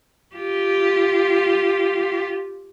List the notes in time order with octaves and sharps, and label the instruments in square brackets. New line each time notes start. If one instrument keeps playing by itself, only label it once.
[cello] F4 G4